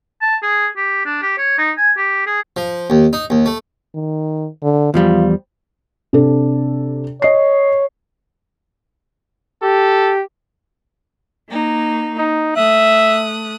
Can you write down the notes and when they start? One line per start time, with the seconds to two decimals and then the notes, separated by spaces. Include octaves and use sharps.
0.21 A5
0.42 G#4
0.76 G4
1.05 D4
1.22 G4
1.38 C#5
1.58 D#4
1.78 G#5
1.97 G4
2.26 G#4
2.57 F3
2.90 D#2
3.13 D#4
3.30 D#2
3.46 A3
3.95 D#3
4.63 D3
4.94 E2 F3 G3 F4
6.13 C3 D4 A4
7.22 C#5 D#5 C7
9.62 G4 A4
11.48 A#3 D#4
12.17 D#4
12.56 A3 E5 D#6 F#6